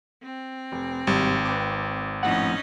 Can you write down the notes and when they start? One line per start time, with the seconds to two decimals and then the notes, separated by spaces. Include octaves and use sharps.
0.23 C4
0.72 F1
1.07 G#1 G2 C3
1.45 B4 G5 D6
2.23 F2 A2 C#4 D#4 F#5